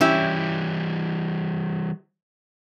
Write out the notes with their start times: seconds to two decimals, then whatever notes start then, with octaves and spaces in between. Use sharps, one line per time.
0.01 E3 G3 C#4 E4 G4